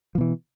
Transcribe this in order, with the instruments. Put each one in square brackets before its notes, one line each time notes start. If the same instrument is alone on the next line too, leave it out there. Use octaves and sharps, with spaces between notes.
[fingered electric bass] F3
B2
E3